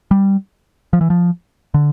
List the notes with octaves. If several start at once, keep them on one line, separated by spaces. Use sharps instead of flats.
G3
F3
E3
F3
D3